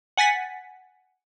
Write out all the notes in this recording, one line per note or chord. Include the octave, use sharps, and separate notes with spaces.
F#5 G#5 A6 B6